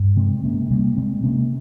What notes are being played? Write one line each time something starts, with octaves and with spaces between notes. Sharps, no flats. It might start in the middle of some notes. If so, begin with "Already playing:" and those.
Already playing: G2
C3 G#3 C4
C3 A#3 C#4
C3 G3 A#3
C3 G#3 C4
C3 A#3 C#4